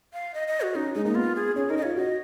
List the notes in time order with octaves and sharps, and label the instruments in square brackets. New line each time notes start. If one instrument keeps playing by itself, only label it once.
[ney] F5
D#5
D#5
F#4
[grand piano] C#4 [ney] D#4
[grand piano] G#3 [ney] D#4
[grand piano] A#3 [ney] D#4
[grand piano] B3 [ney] F4
[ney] G#4
[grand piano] C#4 [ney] G#4
[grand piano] D#4 [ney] A#4
[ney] D#5
[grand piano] F4 [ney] C#5
[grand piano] F#4 [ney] D#5